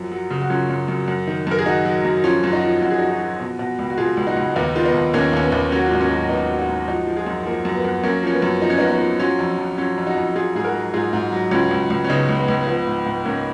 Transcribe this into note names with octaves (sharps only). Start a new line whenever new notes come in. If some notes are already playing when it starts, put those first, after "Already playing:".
Already playing: F#2 F3
F#3
C#3
F#4
F#2 C#4 F4
F#2
F#2
F#2
D#3
F#2 A#4
G#4
D#3 D#4 F#4
F#3
F#2
F3 C#4 F4
F#2 F4
D#4 F#4
F3
F#2 F#4
G#4
F3 D#4 F#4
D#4 F#4
F3
B2
B2
C#2
F#4
B2 F4 G#4
C#2
D#4 F#4
C#2
D#2 B3 D#4
D#3 F4
B3 D#4
D#2
D#2 A#3 C#4
D#2 C#4
B3
D#2
F#3 A#3 C#4
F#4
F4
G#2 D#4
A#3 C#4
F#3
G#2 B3 D#4
F#3
D#4 F#4
G#2
F3 D#4 F#4
F3
F4 G#4
F#2
F3 A#3
F#2
B3
F#2
F#2 A#3 C#4
F3 C#4
B3
F#2
F3 D#4
C#4
F#2 B3 D#4
B3 D#4
F3
F#3 C#4 F4
F2
F2
F#3 C#4 F4
F2
D#4 F#4
F2
F#3 F4 G#4
G#2 G#4
F#4 A#4
F#3
G#2 F4 G#4
G#2
F#3
C#2 C#4 F4
C#2
C#2
C#4
C#3 B3 D#4
C#2
B3
C#2
F3 B3
G#2
G#2
G#2 A#3 C#4